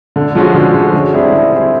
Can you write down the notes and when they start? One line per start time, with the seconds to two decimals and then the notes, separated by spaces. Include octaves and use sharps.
0.16 D3
0.35 F3 G#3 C#4 F#4
0.54 D3
0.74 F3 G#3 C#4 F#4
0.94 D3
1.13 G3 C4 E4 G#4
1.32 D3
1.52 G3 C4 E4 G#4